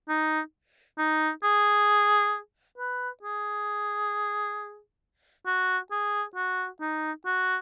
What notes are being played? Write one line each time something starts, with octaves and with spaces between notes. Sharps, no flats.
D#4
D#4
G#4
B4
G#4
F#4
G#4
F#4
D#4
F#4